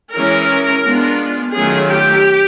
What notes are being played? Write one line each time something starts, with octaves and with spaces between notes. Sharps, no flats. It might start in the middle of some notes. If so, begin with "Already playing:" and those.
E3 G#3 C#4 A#4
G#3 B3 D4 F4
D#3 F#3 A3 C#4 F4 G#4
G4